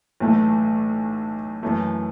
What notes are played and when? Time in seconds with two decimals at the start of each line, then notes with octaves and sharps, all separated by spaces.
0.20 B1 A2 E3 A3
1.63 F#2 E3 A3